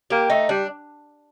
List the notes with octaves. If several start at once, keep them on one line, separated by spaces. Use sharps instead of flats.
A#3 G4
A3 D#4
G3 D4